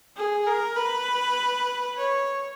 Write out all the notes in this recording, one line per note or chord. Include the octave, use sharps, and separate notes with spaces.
G#4
A#4
B4
C#5